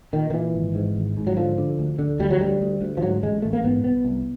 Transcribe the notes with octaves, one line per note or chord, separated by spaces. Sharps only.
A#2 D#3
D#3
A#2 E3
G#1
G#2
G#1
G#2
F#3
D3 F3
D3
D2
D3
D2 G3
F#3
D2 G3
D2
D2
F3
G#2 F#3
A1 G#3
A1 A3
A#3
G#2 B3
C2 B3
C2